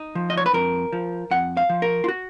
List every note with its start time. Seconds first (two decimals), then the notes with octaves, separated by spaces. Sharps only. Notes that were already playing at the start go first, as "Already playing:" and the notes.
Already playing: D#4
0.15 F3
0.30 D#5
0.37 C#5
0.46 B4
0.54 F2 A#4
0.93 F3
1.31 F2 F#5
1.57 F5
1.70 F3
1.82 A#4
2.04 F4
2.08 F#4